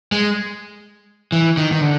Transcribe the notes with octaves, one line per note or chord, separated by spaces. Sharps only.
G#3
E3
D#3
D#3
D3